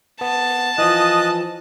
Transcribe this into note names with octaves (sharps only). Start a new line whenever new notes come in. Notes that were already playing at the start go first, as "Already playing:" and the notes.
B3 A5
E3 F3 D#5 D#6 F#6